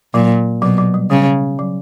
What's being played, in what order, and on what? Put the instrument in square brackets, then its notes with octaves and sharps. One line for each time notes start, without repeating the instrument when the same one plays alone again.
[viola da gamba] A#2 [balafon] F#3
[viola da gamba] B2 [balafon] F#3
[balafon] F#3
G3
[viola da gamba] C#3 [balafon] G3
[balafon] F#3